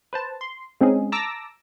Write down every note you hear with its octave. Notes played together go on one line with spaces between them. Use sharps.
B4 C5 A5
C6
G#3 C4 C#4 D#4 G#4
A5 A#5 D6 E6 A#6